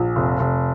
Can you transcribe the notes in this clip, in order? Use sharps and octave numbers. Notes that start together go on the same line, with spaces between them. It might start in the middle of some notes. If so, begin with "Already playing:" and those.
Already playing: A#1
F1
F1